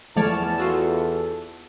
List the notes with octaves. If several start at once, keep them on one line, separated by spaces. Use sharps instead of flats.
E2 F3 A3 C#5 D5 A5 F6
F4 F#4 A4 E6